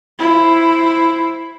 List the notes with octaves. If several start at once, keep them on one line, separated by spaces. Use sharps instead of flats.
E4 C5